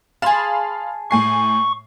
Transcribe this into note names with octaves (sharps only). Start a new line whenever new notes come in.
G#4 F5 A5 B5 C6
A2 G#5 C#6 C7